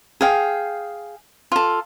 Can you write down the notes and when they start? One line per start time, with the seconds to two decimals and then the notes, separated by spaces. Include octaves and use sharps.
0.21 G#4 F5 G5
1.52 F4 A4